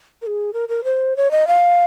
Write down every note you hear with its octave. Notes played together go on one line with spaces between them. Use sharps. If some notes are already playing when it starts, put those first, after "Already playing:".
A#4
G#4
A#4
A#4
C5
C#5
D#5
F5